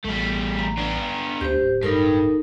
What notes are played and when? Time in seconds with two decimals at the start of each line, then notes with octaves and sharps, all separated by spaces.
0.05 A1 G3 A3
0.59 A#5
0.77 B3 D4
1.41 D2 G4 C5
1.61 D1
1.83 G2 D#4 A4 A#4